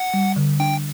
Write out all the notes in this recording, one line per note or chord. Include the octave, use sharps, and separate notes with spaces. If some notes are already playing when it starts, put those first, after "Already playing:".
Already playing: F#5
G3
D3
D4 G5